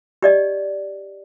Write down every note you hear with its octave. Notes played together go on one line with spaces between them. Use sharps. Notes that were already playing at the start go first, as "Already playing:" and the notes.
G4 D5 D#5